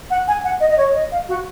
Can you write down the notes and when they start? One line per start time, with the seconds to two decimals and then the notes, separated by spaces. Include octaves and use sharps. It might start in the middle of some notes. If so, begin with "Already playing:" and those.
0.10 F#5
0.28 G#5
0.44 F#5
0.60 D#5
0.71 D#5
0.78 C#5
0.95 D#5
1.12 F5
1.28 F#4